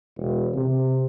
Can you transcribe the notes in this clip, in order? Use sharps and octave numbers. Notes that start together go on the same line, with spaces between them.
E1
C3